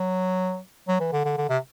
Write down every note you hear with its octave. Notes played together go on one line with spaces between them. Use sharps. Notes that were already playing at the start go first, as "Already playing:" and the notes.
Already playing: F#3
F#3
E3
D3
D3
D3
C3